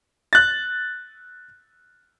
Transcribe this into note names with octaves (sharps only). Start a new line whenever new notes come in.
F#6 A6